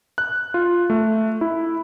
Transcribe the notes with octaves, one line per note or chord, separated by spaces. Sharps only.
F#6
F4
A3
E4